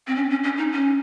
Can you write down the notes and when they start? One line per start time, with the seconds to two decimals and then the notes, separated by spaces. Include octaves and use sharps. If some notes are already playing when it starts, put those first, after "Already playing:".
0.07 C4
0.16 C#4
0.30 C#4
0.44 C#4
0.58 D#4
0.72 C#4